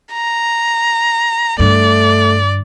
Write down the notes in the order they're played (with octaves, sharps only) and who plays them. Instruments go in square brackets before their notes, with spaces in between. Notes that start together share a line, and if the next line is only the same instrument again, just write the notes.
[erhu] A#5
[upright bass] G2 D3 [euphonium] A3 [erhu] D5